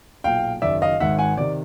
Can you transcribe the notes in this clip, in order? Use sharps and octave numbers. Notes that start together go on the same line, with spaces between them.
B1 A#2 F5 G5
F#1 F#2 D#3 D5 E5
D#5 F5
G#1 G#2 D#3 E5 F#5
F#5 G#5
C3 D#3 D5